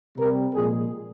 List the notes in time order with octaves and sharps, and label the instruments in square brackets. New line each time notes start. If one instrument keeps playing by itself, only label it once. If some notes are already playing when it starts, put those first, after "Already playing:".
[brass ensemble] C3 G3 A#4
A#2 F3 G#3 G#4